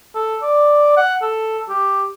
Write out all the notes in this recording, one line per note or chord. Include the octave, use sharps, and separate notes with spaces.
A4
D5
F#5
A4
G4